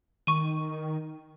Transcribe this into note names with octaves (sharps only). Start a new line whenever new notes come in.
D#3 C#6 D#7